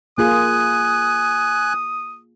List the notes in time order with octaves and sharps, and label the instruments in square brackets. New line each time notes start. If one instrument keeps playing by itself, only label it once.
[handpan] A#3 F4 G#4 [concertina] G#5 F#6 [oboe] D#6